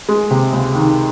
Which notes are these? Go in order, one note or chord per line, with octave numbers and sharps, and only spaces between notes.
G#3
C3
C#2
D#3